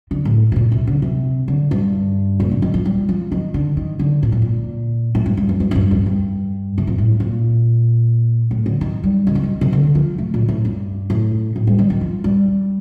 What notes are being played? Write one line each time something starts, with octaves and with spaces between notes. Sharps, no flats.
D3
A2
C3
A#2
C3
D3
C3
D3
G2
A#2
D3
D#3
F3
G3
F3
D#3
D3
D#3
D3
A#2
A2
A#2
A2
G2
G2
F2
G2
A2
G2
F2
G2
C3
A#2
A2
A#2
A2
D3
D#3
G3
D#3
D3
D#3
C3
D3
F3
A3
A#2
A2
G2
A2
A2
G3
D#3
D#3
F3
G3